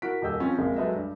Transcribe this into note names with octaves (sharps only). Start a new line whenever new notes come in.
E4 F#4 A#4 B6 D7
D#1 G4 A#4 D#5 E6 G6
F3 C4 C#4
A#1 C3 G#3 A#3
F#3 G#3 A4 B4 D#5 E5
G2